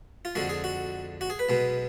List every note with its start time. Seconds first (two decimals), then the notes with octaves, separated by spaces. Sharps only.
0.25 F4
0.35 F2 D3 G#3 F#4
0.49 G#4
0.64 F#4
1.21 F#4
1.30 G#4
1.39 B4
1.49 B1 B2 G#3